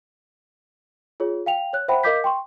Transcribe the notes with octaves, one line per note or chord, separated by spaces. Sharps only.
F4 G#4 C#5
F5 G5 F7
C#5 F#6
C5 E5 F#5 G5 B5
A#4 D#5 F5 D6 G6 B6
G5 C6 C#6